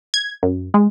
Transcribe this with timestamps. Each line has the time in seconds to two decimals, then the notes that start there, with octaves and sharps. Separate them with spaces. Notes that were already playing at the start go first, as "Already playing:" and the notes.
0.14 G#6
0.43 F#2
0.74 G#3